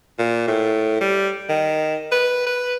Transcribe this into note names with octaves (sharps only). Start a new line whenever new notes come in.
A#2
A2
G3
D#3
B4
B4